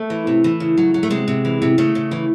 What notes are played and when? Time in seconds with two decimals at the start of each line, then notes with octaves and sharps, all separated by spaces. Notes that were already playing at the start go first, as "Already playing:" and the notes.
Already playing: A3
0.10 E3
0.27 C3
0.44 E3
0.60 C#3
0.77 F#3
0.94 F#3
1.03 A3
1.10 C3 G#3
1.28 C3
1.45 E3
1.62 C3
1.78 C#3 A3
1.95 C#3
2.11 E3